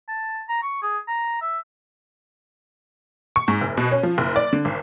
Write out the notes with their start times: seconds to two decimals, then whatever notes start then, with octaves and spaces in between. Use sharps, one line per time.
0.08 A5
0.49 A#5
0.62 C#6
0.82 G#4
1.08 A#5
1.41 E5
3.36 C#6
3.48 G#2
3.61 F#1
3.77 B2
3.91 C#4
4.03 F3
4.18 F#1
4.36 D5
4.53 D3
4.65 G#1